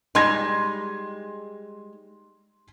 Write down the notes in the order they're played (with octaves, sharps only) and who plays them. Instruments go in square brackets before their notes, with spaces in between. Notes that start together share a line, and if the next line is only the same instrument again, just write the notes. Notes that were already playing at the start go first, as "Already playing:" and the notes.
[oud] G3 G#3 D#4 [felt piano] C6 G#6 A#6